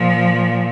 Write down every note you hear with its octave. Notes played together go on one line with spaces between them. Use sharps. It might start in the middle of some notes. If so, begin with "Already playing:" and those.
Already playing: A#2 F3